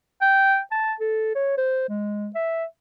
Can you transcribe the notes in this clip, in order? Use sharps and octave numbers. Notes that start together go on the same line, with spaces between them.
G5
A5
A4
C#5
C5
G#3
E5